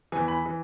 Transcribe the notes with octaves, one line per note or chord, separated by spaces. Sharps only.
E2 E3 G#5
B5
E3